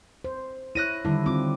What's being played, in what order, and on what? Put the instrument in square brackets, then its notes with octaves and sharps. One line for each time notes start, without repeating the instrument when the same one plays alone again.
[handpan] C5
[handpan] E4 C#5 [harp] F#6 A#6 D#7
[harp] D3 [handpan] D#3 G3 E4
[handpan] C4 F4 [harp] D6